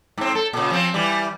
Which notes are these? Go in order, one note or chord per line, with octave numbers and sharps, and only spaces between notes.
G#2 C4
A4
A#2 C#3
F3 C4
E3 G3